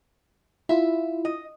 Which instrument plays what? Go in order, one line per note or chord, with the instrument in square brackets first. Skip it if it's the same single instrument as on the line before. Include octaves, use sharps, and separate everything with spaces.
[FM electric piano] E4 F4 [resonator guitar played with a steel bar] E5
[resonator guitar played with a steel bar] D#5